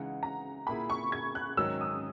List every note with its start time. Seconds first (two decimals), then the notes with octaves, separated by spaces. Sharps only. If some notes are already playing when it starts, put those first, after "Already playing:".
Already playing: C#3 E3 G#3 D#4 F#5
0.23 A#5
0.67 A#2 A#3 E4 G#4 B5
0.90 C#6
1.12 G#6
1.35 F#6
1.57 G#2 D#3 F#3 C#4 E6
1.81 D#6